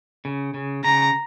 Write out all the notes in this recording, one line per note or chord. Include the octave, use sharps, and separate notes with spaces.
C#3
C#3
C#3 A#5